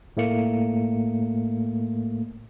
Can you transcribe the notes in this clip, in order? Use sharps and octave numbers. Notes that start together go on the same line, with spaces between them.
A2 A3 A#3 C#7